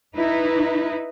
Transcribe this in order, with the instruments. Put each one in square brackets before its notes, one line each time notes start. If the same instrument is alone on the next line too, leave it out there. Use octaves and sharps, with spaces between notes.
[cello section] D#4 E4 B4